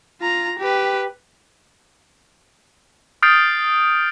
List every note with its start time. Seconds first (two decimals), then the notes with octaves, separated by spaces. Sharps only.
0.21 F4 A#5
0.59 G4 B4
3.22 D#6 F6 G6 A6 C7 D7